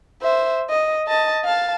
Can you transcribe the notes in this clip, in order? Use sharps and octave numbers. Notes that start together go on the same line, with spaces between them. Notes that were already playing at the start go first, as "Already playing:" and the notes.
C5 E5
D#5
D#5 A5
F5 A5